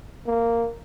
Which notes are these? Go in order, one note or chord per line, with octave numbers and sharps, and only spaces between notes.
A#3